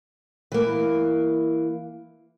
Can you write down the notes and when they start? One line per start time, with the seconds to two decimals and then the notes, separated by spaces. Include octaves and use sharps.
0.52 E3 A#3